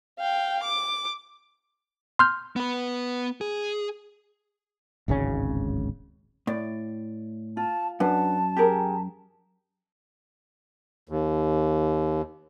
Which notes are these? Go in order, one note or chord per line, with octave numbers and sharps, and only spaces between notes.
F5 G5
D6
C6 F6 G6
B3 B4
G#4
D1 G#1 C#3 C#4
A2 D5
F4 A5
F#2 D4 B4 F#5 A5
G4 G#4 A#4
D#2